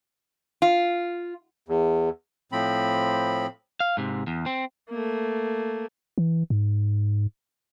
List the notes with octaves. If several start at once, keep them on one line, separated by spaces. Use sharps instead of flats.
F4
E2
A2 F3 C4 B5
F5
G#2 C3
E2
C4
A3 A#3
E3
G#2